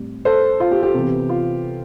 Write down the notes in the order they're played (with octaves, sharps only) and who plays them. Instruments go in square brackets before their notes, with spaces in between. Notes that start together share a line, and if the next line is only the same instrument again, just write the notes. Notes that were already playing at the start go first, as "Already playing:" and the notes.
Already playing: [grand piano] A2 G3 C4
A4 C5
F4
G4
G4
C3 E3 B3
F4